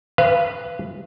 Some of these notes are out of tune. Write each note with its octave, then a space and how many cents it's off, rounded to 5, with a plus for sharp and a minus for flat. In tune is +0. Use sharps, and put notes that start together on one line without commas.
B4 +0 F5 -30